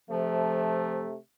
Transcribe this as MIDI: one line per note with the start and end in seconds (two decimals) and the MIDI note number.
0.10 1.17 48
0.10 1.04 53
0.10 1.17 57